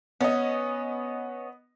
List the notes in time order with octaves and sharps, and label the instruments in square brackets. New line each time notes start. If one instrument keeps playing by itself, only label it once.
[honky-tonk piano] B3 D#5 [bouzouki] C#4